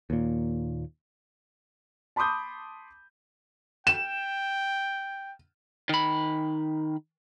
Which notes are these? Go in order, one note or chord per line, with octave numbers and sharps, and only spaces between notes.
D#2 A#2
A5 B5 C6 D6 D#6 G6
G5 E7
D#3 B5